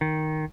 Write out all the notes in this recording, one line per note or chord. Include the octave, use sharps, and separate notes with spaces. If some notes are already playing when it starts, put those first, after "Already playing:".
D#3